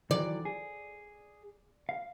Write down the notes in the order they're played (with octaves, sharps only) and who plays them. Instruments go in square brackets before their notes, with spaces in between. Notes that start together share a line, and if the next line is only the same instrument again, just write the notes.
[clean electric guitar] D#3 E3 F#3 [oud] D5
[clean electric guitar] G#4
F5